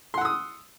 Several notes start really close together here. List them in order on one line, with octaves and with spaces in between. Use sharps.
C6 F#5 E6 D#6